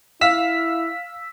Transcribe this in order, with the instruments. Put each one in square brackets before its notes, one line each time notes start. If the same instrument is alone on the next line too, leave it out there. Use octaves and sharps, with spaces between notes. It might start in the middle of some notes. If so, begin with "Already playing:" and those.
[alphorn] E4 [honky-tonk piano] F5 [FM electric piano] E6 B6